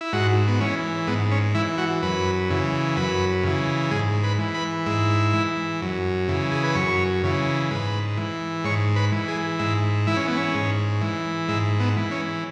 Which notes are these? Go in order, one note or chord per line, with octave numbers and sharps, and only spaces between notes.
E4
G#2 F#4
B3
E3 C#4
G#2 B3
C#4
E3 E4
F#4
F#2 B4
C#3 E3
F#2 B4
C#3 E3
G#2 G#4
B4
E3
B4
G#2 E4
E3
F#2
C#3 E3
G#4
B4
F#2 C#5
C#3 E3
G#2 B4
E3
G#2 C#5
B4
E3
G#4
G#2 E4
E3 E4
C#4
B3
C#4
G#2
E3
G#2 E4
B3
E3
C#4